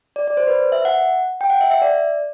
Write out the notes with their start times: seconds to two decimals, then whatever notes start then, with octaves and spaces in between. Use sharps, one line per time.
0.16 D5
0.27 D5
0.37 C5
0.47 B4
0.72 E5
0.85 F#5
1.41 G5
1.50 F#5
1.61 E5
1.71 E5
1.82 D5